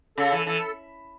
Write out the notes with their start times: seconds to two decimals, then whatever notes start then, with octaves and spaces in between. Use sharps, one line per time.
0.18 C#3 A4
0.32 E3
0.46 E3 A4